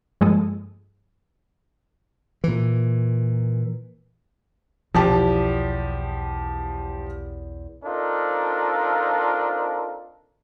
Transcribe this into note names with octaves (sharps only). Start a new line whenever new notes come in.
G2 F3 G#3 A#3 A4 D#6
A#2 E3
B1 E2 F3 G4 A5
C4 D4 D#4 F4 A4 A#4